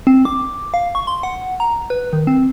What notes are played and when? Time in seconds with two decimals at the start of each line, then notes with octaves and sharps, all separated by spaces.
0.07 C4
0.25 D6
0.74 F5
0.95 C#6
1.07 C6
1.23 F#5
1.60 A#5
1.90 B4
2.13 D#3
2.27 C4